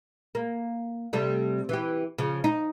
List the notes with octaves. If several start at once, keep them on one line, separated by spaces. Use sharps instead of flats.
A#3
C3 G3 A3
E3 G4
C#3 F3
D#4